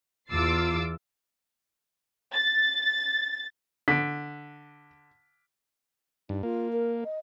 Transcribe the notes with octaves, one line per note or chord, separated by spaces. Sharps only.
E2 F4 D6 E6 A6 C7
A6
D3 B6 D7
G2 D#4
A#3 F4
A#4
D#5